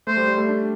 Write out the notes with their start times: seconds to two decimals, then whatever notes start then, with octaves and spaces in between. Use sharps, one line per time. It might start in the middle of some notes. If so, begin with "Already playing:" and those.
0.07 A3 C5
0.17 G3
0.28 G3
0.38 A3
0.49 D4